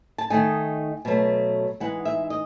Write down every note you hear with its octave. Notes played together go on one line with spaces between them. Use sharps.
A5
D#3 A3 D#4 G#5
B2 F#3 A3
E3 G#3 D#4 F#5
E5
D#5